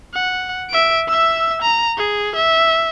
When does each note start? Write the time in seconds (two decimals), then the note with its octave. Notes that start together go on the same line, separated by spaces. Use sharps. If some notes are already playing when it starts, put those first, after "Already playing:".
0.14 F#5
0.70 E5 D7
1.08 E5 E6
1.62 A#5
1.98 G#4
2.36 E5